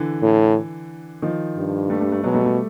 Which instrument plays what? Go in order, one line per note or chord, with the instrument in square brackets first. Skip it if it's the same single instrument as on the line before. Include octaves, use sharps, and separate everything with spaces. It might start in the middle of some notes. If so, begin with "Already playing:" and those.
Already playing: [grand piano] D3 E3
[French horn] A2
[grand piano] D#3 F3
[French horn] G2
[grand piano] G3 A3
G3 A3
G3 A3
[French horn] B2 [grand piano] F#3 G#3
[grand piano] G3 A3
G3 A3